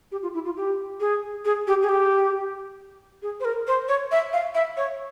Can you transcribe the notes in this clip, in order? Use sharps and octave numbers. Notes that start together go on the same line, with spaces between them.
G4
F4
E4
F4
G4
G#4
G#4
G4
G#4
G4
G#4
C5
A#4
C5
C#5
E5
F5
E5
C#5